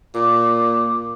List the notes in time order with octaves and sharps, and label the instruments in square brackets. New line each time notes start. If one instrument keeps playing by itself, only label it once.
[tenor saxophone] A#2 [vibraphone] D6